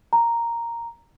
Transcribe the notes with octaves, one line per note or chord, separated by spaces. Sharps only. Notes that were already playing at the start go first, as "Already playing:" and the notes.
A#5